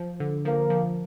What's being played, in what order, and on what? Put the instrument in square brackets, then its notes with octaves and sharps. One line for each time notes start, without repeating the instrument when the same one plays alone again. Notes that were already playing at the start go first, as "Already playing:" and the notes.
Already playing: [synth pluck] F3
D3
[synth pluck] F3 [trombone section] A#3
[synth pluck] F3